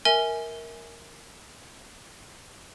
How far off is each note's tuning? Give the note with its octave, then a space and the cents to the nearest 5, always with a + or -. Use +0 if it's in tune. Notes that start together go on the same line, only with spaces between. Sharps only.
A#4 +0 E5 -30 G#5 +0